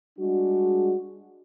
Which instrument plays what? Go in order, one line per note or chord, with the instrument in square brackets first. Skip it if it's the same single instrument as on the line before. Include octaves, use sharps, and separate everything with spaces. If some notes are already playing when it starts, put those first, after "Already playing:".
[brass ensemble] G3 G#3 D4 F#4